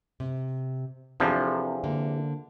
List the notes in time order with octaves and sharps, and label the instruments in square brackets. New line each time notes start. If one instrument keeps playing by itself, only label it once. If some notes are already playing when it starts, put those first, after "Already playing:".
[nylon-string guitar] C3
[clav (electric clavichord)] E2 C3 F3 [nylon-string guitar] C4 D4 A4
[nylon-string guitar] D3 A#3